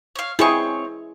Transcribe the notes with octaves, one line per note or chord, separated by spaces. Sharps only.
C#5 F5
C4 E4 G#4 C#5 C#6